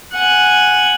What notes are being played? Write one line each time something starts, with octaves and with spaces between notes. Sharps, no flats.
F#5 G#5